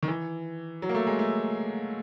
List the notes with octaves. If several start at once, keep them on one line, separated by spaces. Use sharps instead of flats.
D#3
E3
F#3
A#3
A3
G#3
A3